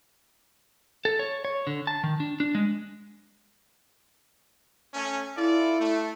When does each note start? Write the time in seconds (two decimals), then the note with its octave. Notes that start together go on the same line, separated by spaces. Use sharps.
1.05 A4
1.19 C#5
1.45 C#5
1.67 D3
1.87 A5
2.04 D#3
2.20 D4
2.40 D4
2.55 G#3
4.94 A3 C#4
5.37 E4 F4 A4 D5
5.79 A3